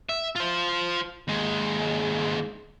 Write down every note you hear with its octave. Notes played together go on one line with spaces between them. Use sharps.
E5
F4 C5
D#2 G#3